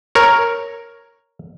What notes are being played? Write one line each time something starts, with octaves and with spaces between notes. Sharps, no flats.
A#4 C#5